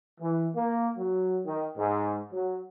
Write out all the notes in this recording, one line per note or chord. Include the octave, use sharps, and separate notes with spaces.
E3
A#3
F#3
D#3
G#2
F#3